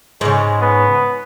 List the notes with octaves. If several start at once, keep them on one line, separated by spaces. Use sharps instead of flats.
G#2 C#3 G#3
B3